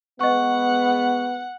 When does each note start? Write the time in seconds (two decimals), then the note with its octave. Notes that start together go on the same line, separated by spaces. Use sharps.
0.21 G#3 B3 D#5 F#5 C#6